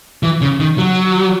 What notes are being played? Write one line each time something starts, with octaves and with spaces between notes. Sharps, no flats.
E3
C#3
D#3
F#3